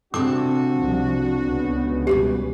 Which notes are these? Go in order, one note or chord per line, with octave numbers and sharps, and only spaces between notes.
C3 C4 D4 F#4 A4 A5 D6
C2 F3
C#2 C#3 B3
B2 E3 G3 G4